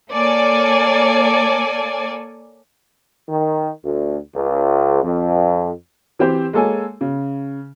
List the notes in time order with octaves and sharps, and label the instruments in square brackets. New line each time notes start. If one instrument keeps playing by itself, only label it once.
[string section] A#3 A4 C#5 D5 G#5
[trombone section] D#3
D2
C#2
F2
[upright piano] E3 C4 G4 C5
G#3 A#3 A4 C#5 G#5
C#3